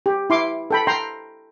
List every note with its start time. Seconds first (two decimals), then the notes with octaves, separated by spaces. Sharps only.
0.06 G4
0.30 E4 C6 D6
0.71 A4 G5 B5
0.87 G5 A#5 C6